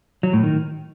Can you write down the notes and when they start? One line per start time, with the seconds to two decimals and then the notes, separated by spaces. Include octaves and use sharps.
0.23 F#3
0.33 A2
0.43 D#3